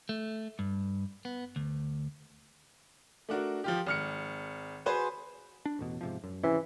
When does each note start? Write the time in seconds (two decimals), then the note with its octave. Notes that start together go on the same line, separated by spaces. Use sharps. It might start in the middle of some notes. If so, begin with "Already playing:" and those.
0.09 A3
0.59 G2
1.25 B3
1.56 D2
3.29 A3 D4 F#4 A#4
3.64 F3 F4 G4
3.87 G#1 F6 C#7
4.86 F#4 G#4 B4 C5 G#5 C6
5.66 D4
5.79 A1 E2 B2
6.01 G#2 C3 F3
6.24 F#2
6.43 G#1 C3 E3 C#4